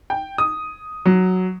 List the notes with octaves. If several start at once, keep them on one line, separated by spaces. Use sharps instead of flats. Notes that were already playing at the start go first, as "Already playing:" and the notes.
G5
D#6
F#3